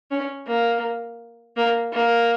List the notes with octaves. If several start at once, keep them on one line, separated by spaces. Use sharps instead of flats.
C#4
A#3
A#3
A#3